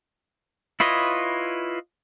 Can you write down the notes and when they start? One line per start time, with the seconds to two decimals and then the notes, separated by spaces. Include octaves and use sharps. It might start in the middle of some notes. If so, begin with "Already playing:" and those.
0.80 E4 F4 B4 C#5 D#5